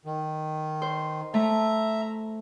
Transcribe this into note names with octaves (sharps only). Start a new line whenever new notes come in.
D#3
C5
A3 E5 A#5